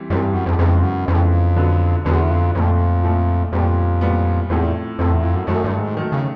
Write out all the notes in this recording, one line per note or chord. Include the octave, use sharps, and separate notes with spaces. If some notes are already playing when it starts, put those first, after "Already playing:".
Already playing: E3 G3 C4
F#2 E3 G3 C4
G2
F#2
F2
F2 C#3 E3 G#3 B3
F#2
F2 C#3 E3 G#3 B3
D3 F#3 B3
E2 D3 F#3 B3
F2
F2 A#2 F3 A3
A#2 F3 A3
F2 A#2 G3 B3
A#2 G3 B3
E2 A2 F3 A3 C4
F2 A2 F3 A3 C4
E2
F2
F#2
F#2 D#3 F#3 A3
G2
G#2
D#3 F#3 A3
C#3